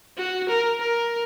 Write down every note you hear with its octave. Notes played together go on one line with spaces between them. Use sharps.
F#4
A#4
A#4